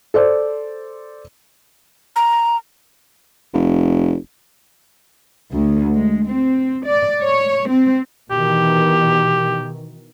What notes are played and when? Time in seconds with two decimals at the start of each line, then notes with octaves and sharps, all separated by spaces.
0.14 A4 C5 D5
2.16 A#5
3.53 F1
5.51 D2
5.93 G#3
6.25 C4
6.84 D5
7.21 C#5
7.67 C4
8.31 B2 D#3 E3 G4